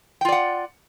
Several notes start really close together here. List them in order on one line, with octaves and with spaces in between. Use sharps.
G5 F4 D5 F#5